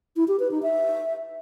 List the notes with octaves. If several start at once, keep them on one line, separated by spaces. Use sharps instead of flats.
E4
G4
B4
D#4
E5